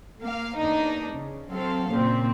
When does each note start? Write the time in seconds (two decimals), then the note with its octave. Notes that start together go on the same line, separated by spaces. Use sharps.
0.21 A#3 F5
0.57 E2 A#3 D4 D#4
1.11 C#3
1.50 F#3 C4 A4 C5 F5
1.92 A#2 C#3 C4